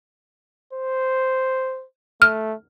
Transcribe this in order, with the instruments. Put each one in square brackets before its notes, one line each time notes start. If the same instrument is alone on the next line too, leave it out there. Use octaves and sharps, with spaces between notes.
[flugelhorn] C5
[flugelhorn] A3 [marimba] F6